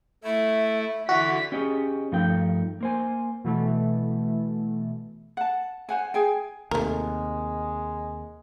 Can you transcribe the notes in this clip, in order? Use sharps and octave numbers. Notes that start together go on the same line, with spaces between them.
A3 E4 E5
D3 E3 F#4 B6
C#4 G4 G#4 C#5 D#5
G2 F3 A3 D#4 G5
A#3 C5 G#5
B2 E3 A3
F#5 A5
C5 F#5 G#5
G#4 G5 G#5
D#2 C3 G#3 A3 A#4